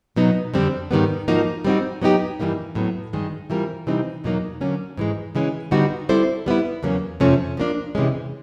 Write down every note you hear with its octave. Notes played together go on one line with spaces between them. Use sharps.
B2 F#3 B3 D#4
F2 D3 G3 C4
G#2 D#3 G3 B3
G#2 F3 A#3 D#4 F#4
G3 C4 D#4 F#4
F#3 B3 D#4 G4
G2 E3 G3 A#3 D#4
A2 F#3 B3
G2 D#3 G#3
E3 G3 C4 F4 A#4
C3 E3 G3 C4 D#4
E2 B2 F#3 A#3 D#4
D3 F#3 A#3 C#4
G#2 E3 G#3
C#3 E3 G#3 C#4
D3 G3 B3 D#4 F#4
G3 C4 E4 A4 C5
G3 B3 E4
E2 C#3 F#3 A#3 C#4
F2 C3 F3 A3 C#4
F3 A#3 D4
C3 E3 G#3 C#4